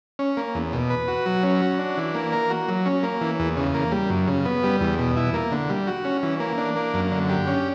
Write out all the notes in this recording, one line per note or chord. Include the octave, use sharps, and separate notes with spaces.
C#4
A#3
E2
B2
B4
F#4
F#3
C#4
F#4
D4
E3
A#3
A#4
F#4
F#3
C#4
A#3
E3
E2
C#3
A#3
G3
F#2
C#3
B3
G3
E2
B2
E4
A#3
D3
G3
F#4
C#4
E3
A#3
D4
A#3
F#2
D3
G4
C#4